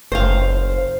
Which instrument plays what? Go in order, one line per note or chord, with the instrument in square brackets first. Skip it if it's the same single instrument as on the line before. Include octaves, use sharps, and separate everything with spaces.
[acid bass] F#1 [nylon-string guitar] C5 F5